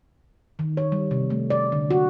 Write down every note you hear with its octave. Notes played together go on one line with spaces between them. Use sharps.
D#3
C#5
G3
C3
A3
D5
D3
F#4